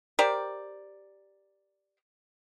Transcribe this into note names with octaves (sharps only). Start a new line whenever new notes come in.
G4 A#4 C5 D5